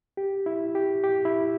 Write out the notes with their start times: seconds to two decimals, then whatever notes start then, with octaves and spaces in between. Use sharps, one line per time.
0.17 G4
0.46 E4
0.75 G4
1.04 G4
1.25 E4